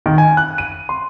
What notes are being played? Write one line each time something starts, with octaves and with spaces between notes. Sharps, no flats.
D#3
G#5
F#6
D#7
C6